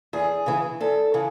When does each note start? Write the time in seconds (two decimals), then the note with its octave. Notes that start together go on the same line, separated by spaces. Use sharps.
0.13 E2 G#4
0.46 C#3 E3
0.80 E2 A4
1.14 C#3 E3